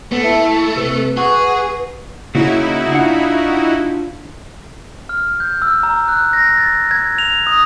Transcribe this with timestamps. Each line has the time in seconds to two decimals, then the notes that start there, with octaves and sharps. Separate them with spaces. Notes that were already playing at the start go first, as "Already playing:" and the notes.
0.12 A3 B3
0.24 E4 A5
0.76 C3 B4
1.17 F#4 G#4 F#5
2.35 C#3 A#3 C#4 D#4 E4 F#4
2.92 D4 F4 F#5
5.09 F6
5.40 G6
5.62 E6
5.83 A#5
6.08 F#6
6.33 A#6
6.57 A6
6.91 G#6
7.18 F7
7.47 D#6